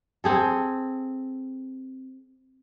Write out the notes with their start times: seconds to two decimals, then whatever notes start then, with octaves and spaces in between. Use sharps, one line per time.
0.24 C4 G#4 A4